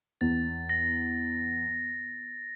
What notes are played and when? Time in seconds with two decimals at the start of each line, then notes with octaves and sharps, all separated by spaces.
0.21 E2 A6
0.69 A#6